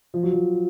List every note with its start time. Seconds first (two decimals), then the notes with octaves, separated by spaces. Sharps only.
0.14 F3
0.23 F#3
0.33 F3